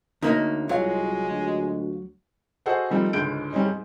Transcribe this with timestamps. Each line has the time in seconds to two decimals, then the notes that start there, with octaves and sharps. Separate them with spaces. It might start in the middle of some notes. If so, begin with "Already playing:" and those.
0.22 D2 A#3 D#4 C#5 D#5
0.69 C2 F#3 G#3 F4 C#5 F5
1.29 D2
2.66 F#4 G#4 A4 C5 D#5 F#5
2.90 D#3 F3 G3 A3 C4 D#4
3.13 C#2 G#2 D3 G6 D7
3.53 G3 C4 C#4 D#4
3.65 G#2